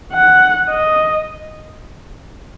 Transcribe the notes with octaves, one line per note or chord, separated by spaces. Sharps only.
F#5
D#5